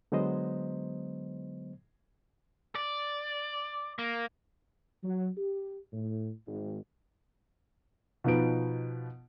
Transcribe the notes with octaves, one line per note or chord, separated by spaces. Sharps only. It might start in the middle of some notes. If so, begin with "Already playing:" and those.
D3 F#3 G#3 B3 C5 D#5
D5
A#3
F#3
G4
A2
G#1
B2 F3 D#4 B4 D7